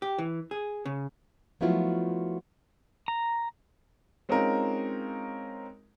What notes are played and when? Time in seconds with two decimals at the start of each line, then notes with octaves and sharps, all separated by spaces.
0.02 G4
0.18 E3
0.51 G#4
0.86 C#3
1.61 F3 F#3 A3 B3 E4 F4
3.08 A#5
4.29 G#3 C4 C#4 D#4 F4 A#4